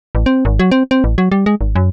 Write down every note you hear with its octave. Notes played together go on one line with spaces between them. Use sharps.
A1
C4
G#1
F#3
C4
C4
A1
F#3
G3
G#3
G#1
F#2